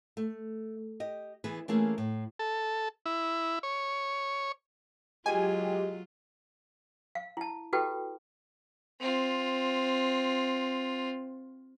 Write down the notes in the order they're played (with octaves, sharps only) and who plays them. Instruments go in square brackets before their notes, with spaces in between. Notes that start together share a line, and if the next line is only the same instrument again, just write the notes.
[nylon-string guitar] A3
G4 D#5
E3 B3 G#4 B4
E3 A3 A#3 C#4 E4 G#4
A2
[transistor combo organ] A4
E4
C#5
[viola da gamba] F#3 F4 [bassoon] G#3 [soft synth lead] G4 [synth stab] G#5
[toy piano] F5
E4 A5
E4 F#4 G4 A4 B4 G5
[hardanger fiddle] C4 F4